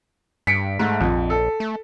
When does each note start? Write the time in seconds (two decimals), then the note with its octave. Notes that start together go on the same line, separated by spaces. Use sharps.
0.47 G2 B6 C#7 D7
0.79 G#2 A3
1.01 A#1 F2
1.30 A4
1.60 A3